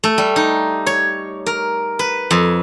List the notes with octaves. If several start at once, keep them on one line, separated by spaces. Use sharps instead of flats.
A3
G3
D#4
C#5
A#4
B4
F2